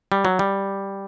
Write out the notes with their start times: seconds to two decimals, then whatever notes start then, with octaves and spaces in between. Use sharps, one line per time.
0.12 G3
0.25 F#3
0.39 G3